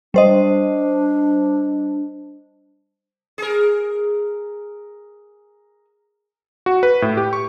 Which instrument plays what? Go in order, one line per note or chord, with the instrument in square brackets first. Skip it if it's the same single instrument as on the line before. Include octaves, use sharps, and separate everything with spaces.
[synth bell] G3 C5 D#5 [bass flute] D4
[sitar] G#4 A#4
[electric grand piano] F#4
B4
A2
G4
C#6